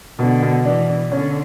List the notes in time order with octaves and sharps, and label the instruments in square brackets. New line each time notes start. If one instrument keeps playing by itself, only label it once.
[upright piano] B2 [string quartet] D3
[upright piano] B2
[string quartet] E3 [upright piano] D4
[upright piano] D4
[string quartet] D3 [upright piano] C#4